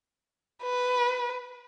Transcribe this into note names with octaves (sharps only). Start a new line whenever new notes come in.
B4